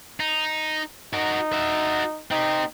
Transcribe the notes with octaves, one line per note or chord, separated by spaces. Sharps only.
D#4
D#4 F#4 A#4
F#4 E5
C4 D#4 G4